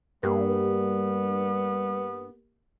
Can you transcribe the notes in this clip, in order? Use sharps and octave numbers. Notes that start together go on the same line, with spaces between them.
G2 G3 A#3 B3 G4 A#4